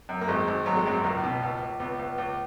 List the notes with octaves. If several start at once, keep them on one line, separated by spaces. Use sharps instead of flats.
F#2
A#3
G#1 G#3
G#1
G#1 F#3
G#3
F#2 F#3
C#2 A#3
B2
C#2
C#2
C#2 B3
C#2
C#2